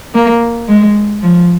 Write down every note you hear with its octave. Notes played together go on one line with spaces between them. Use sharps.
A#3
G#3
F3